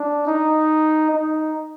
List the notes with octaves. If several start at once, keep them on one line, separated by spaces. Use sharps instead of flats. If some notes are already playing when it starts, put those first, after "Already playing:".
Already playing: D4
D#4
D#4